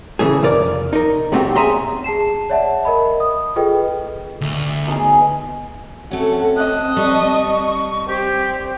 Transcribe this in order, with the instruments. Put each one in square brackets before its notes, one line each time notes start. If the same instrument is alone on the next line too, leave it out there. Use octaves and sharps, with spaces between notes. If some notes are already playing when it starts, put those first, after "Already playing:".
[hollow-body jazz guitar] C#3 E3 A3 G#4
F2 C3 A#4 D5
D#4 A#4
B1 G3 A3 C4 F#4 G4
B1 E2 G#4 E5 A#5 C6
[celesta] G#4 A5 C7 E7
C#5 D5 E5 F#5 A5
A#4 D#5 B5
D#6
F4 G#4 A4 B4 D#5 G5
[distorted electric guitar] D2
[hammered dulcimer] B2 D#4 G#4
[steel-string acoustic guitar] A3 C#4 [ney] C4 [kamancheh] F#4 A4
[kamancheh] D#5 A5 [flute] F#6
[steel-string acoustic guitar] G3 [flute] C#6
[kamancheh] C4 [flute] G4